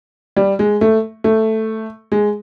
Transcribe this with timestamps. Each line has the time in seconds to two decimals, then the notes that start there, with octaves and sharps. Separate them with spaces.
0.37 G3
0.59 G#3
0.81 A3
1.24 A3
2.12 G#3